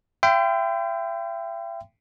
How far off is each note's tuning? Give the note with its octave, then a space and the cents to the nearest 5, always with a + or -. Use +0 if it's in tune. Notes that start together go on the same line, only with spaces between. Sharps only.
E5 +40 G5 +0 C6 -40